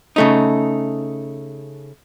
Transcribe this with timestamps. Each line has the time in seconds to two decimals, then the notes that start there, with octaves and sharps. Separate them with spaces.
0.16 C#3 A3 D#4